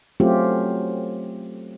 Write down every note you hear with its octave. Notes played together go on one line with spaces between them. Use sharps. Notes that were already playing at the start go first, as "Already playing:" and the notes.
F#3 A3 C4 C#4 F4 G4